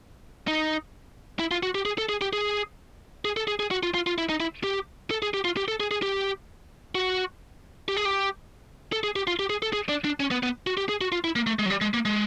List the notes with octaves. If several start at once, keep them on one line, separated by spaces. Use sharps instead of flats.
D#4
E4
F4
F#4
G4
G#4
A4
G#4
G4
G#4
G#4
A4
G#4
G#4
F#4
F4
F4
F4
E4
D#4
E4
G4
A4
G#4
G4
F4
G4
A4
G#4
G#4
G4
F#4
G4
G#4
G4
A4
G#4
G4
F4
G4
G#4
A4
G#4
D4
D4
C#4
B3
B3
F#4
G4
G#4
F#4
F4
E4
A#3
A3
G#3
F#3
G3
G#3
A#3
G#3